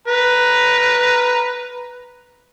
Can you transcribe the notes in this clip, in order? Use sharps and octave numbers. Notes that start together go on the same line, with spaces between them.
B4 A#5